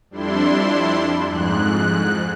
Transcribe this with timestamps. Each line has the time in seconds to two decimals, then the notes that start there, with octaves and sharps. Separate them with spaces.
0.10 F2 G3 D4 E4 C6
1.25 F2 G#2 F#6